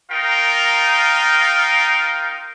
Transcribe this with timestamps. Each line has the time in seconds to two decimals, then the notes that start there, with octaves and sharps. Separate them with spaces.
0.11 D#4 F4 A#4 F5 G5